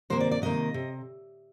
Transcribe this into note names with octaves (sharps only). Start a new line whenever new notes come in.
C3 D#3 A#3 C5
D5
D5
C3 D#3 A#3 D#5
C3